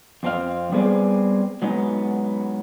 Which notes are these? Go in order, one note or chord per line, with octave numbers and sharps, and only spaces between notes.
F2 C4 D4 F5
G3 B3 C4 G#4 D5
F#3 G#3 B3 D#4